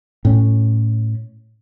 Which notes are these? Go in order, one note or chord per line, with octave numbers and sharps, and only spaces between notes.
A2 C#4